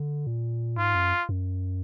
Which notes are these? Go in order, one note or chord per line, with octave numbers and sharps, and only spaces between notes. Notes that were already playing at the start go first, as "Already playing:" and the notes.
Already playing: D3
A#2
G#2 F4
F#2
F#2